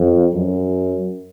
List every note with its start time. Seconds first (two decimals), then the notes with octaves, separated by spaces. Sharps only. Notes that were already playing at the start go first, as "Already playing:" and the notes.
Already playing: F2
0.34 F#2